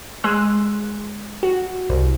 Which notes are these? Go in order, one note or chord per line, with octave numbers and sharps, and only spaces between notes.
G#3 G#4 C6 E6 F#6
F#4
C2